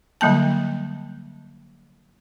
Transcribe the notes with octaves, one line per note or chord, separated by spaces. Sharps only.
D3 F#3 G3 A#3 A5